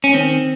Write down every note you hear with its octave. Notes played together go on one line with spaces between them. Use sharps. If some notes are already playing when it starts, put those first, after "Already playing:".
C#4
D#3 C4